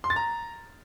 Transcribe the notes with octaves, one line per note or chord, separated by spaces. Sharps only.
C6
A6
A#5